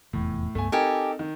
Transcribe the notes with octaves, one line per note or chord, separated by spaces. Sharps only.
F1 E2 A2
C#2 G2 A3 B3 G#5
C4 D#4 G4 A4 A#4 G#5
D#3